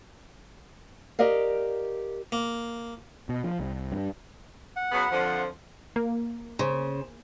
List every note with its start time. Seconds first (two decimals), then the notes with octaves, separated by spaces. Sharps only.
1.19 G4 A#4 D5 D#5 F5
2.32 A#3
3.29 B2
3.44 F3
3.60 C2
3.92 G2
4.76 F#5
4.92 C#3 F#3 B3
5.12 F2 D3 F3
5.96 A#3
6.59 C#3 C5